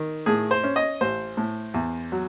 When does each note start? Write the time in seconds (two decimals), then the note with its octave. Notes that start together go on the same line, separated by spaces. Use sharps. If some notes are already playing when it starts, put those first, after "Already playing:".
Already playing: D#3
0.26 A2 G#4
0.51 C5
0.64 C#4
0.76 D#5
1.01 A1 C5
1.37 A2
1.74 E2
2.12 F#3